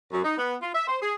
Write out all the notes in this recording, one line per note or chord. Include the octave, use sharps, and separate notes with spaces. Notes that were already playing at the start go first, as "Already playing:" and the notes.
F#2
D#4
B3
F4
E5
C5
G#4